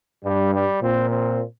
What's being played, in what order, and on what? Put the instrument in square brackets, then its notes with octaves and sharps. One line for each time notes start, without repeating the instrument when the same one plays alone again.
[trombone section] G2 [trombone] G3
[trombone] G3
[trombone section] A#2 [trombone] C4
[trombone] C4